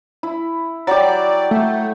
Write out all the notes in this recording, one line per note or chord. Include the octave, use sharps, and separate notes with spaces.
E4
F#3 G4 D5
A3